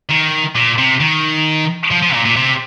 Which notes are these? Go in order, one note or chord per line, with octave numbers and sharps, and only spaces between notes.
D#3
A#2
C3
D#3
F3
F3
A#2
A#2
C3